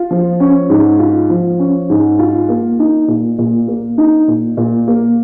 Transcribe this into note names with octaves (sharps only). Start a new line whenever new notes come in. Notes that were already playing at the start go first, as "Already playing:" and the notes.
Already playing: F4
F3
C#4
G#2
F4
F3
C#4
G#2
F4
A#3
D#4
A#2
A#2
A#3
D#4
A#2
A#2
A#3